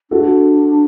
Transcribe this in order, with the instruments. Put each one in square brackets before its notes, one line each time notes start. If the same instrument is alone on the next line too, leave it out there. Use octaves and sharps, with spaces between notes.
[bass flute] D4 [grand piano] F#4 A4